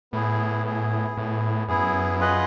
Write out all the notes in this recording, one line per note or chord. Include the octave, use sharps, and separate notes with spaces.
A2 B3 E4 G#4
B3 E4 G#4
A2 B3 E4 G#4
F#2 B3 E4 G#4
F4 G#4 B4 D#5 F#5